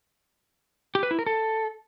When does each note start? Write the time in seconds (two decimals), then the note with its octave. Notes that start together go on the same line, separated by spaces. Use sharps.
0.95 G4
1.03 B4
1.11 E4
1.19 A#4
1.26 A4